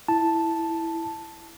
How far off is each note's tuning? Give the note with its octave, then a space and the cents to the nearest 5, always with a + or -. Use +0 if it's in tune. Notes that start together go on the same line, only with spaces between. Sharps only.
E4 +0 A5 +0